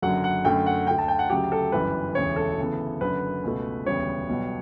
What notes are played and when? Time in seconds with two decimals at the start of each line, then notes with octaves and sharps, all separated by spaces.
0.02 F#1 F#2 D3 F#3 F#5
0.24 F#5
0.45 F#2 D3 A3 G5
0.66 F#5
0.87 D2 D3 A3 G5
0.98 A5
1.08 G5
1.19 F#5
1.30 D2 C#3 F#3 G4
1.52 A4
1.72 G1 F#2 E3 G3 B4
2.15 E1 D2 C#3 E3 C#5
2.36 A4
2.58 D2 C#3 E3 B3
3.01 F#1 F#2 D3 B4
3.44 C#2 B2 A3
3.86 E1 D2 C#3 G3 B3 C#5
4.29 B1 B2 G3 B3